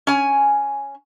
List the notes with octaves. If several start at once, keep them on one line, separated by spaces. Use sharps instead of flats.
C#4 G#5